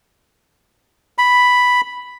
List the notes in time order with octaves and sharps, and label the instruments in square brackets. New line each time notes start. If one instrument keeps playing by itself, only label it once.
[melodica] B5